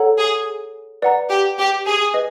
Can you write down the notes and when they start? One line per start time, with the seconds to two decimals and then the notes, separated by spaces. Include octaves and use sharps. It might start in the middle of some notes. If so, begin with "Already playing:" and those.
Already playing: A4 C#5 F#5 A#5
0.18 G#4
1.02 B4 D5 F#5 A#5
1.30 G4
1.58 G4
1.86 G#4
2.14 B4 D#5